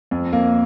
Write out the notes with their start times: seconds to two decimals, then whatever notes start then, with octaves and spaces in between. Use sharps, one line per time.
0.11 F2
0.33 A#3